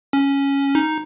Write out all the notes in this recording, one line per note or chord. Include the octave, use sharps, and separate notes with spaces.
C#4
D#4